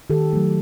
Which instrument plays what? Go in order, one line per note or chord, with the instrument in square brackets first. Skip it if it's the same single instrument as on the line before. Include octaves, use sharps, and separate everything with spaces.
[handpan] D#3 G4 A4
F#3 A3